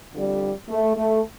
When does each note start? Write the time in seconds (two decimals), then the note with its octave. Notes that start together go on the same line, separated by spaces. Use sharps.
0.12 F2 D3 G3
0.69 A3
0.97 A3